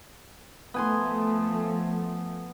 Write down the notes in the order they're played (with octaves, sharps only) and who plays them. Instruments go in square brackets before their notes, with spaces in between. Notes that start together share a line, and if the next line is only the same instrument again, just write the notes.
[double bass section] F3 A3 [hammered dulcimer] B3 G#5 C6